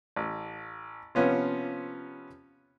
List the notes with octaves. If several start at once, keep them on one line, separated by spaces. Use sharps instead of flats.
A1
C3 F3 B3 C#4 F4